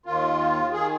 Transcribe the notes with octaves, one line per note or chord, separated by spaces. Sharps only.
D#2 D#3 F4
D#3 G#4